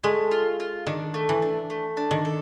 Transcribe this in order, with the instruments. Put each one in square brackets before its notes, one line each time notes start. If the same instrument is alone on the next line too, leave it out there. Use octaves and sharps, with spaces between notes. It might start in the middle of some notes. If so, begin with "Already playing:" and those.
[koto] G#3 [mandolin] A3
[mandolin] F4
F4
[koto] D#3 [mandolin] D4
[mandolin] A3
[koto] E3
[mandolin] D4
A3
D4
[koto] D#3
[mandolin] A4